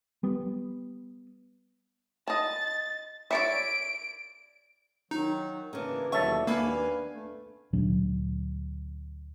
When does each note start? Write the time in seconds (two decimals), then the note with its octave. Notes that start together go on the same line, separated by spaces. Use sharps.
0.23 G3 B3
2.28 D#5 A5 A6
3.31 C#5 D5 E5 D7
5.11 D#3 F#3 D#4
5.73 C#3 E3 A#3 D4 A#4
6.12 D#2 B2 D3 F#3 G3 E5 A5 C#6
6.47 D#2 A#3 B3 D4 B4 F5 G#5
7.12 A3
7.73 D2 A#2 F#3 D4